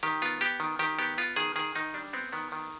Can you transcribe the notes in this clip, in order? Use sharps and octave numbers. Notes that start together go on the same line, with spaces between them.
D#3 G4
B3 F4
B3 G4
D#3
D#3 G4
B3 G4
B3 F4
D#3 G#4
D#3 G#4
D#3 D#4
G3 D4
B3 C4
D#3 B3
D#3